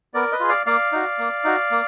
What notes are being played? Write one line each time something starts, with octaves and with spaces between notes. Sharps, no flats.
B3 A#4 D5
B4 D#5
F4 G#4
D5 F5
A#3 D5 F5
D#4 F#4
A#3
D#4 F#4
A#3